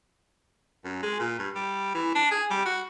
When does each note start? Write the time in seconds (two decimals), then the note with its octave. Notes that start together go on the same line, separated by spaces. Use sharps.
0.84 F#2
1.03 G#3
1.20 A#2
1.39 G2
1.55 G3
1.94 E3
2.15 D4
2.31 G#4
2.50 G3
2.66 F#4